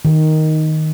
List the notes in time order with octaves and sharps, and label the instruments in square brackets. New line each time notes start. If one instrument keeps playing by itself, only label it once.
[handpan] D#3